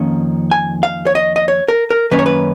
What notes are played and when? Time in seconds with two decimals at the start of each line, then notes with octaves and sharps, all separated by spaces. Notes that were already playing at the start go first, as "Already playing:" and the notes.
Already playing: F2 D#3 A#3 C#4
0.51 G#5
0.83 F5
1.07 C#5
1.15 D#5
1.36 D#5
1.48 C#5
1.68 A#4
1.90 A#4
2.11 F#2 D#3 A#3 C#4 B4
2.19 C#5
2.26 B4